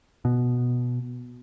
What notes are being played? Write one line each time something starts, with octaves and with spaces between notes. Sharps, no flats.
B2